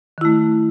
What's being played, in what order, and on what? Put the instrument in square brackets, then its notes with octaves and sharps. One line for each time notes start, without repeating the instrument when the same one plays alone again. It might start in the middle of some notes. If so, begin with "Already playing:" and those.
[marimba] D#3
E4
A3